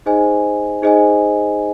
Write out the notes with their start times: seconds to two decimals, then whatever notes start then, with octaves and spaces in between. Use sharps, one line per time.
0.06 D#4 G#4 C5 D#5 G#5
0.82 D#4 G#4 C5 D#5 G#5